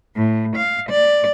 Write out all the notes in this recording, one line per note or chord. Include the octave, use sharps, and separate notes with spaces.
A2
F5
D5